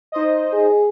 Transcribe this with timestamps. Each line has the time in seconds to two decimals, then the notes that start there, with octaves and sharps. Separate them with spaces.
0.12 D#4 C5 D#5
0.52 G#4